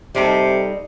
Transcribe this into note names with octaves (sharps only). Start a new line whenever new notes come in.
C3 G3 D#4 A4